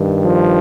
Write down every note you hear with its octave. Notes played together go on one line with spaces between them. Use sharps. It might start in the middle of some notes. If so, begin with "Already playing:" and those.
Already playing: G2 D#3
F3